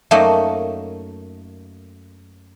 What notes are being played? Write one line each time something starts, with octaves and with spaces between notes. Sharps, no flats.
F#2 A3 A#3 D#4 F#4 D#5